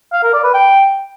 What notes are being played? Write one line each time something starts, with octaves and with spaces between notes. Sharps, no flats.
F5
A#4
D5
B4
G5